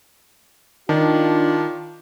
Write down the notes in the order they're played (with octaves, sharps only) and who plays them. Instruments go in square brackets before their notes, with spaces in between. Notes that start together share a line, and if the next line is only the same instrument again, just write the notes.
[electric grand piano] D#3 [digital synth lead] D4 [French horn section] F4